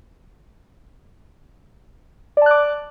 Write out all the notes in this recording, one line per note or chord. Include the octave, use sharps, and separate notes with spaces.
D5 A5 D6 F#6